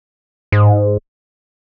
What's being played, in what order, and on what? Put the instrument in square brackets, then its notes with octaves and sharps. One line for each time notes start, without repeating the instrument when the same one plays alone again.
[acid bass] G#2